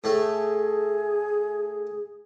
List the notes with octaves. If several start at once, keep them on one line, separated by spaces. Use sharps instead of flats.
A2 A3 G#4